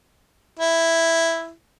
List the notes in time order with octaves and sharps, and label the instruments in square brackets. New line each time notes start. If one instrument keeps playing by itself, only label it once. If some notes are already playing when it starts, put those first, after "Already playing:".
[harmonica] E4